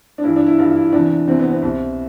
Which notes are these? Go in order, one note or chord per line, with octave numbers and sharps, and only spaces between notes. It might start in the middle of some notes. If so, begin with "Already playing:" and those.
D4
G2 E3 E4
D4
E4
G2 E3 F4
E4
E2 C3 E3 D4
E2 C3 E3 C4
B3
C4
C2 B2